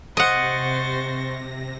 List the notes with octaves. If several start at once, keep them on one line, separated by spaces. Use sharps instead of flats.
C3 C5 D#5 F#5 C#6 A6 A#6